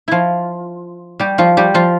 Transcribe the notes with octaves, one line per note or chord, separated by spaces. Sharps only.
F3 E4 F4
G3 G4
F3 F4
G3 G4
F3 F4